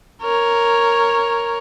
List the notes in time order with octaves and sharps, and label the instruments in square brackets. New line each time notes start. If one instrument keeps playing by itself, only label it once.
[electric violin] A#4 C#5